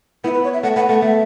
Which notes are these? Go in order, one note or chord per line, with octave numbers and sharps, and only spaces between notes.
B3 E4
B4
C#5
E5
A3 F#5
B3 F#5
A3 F#5
A3 E5